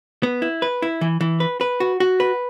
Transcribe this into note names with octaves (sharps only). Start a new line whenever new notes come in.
B3
E4
B4
E4
E3
E3
B4
B4
F#4
F#4
B4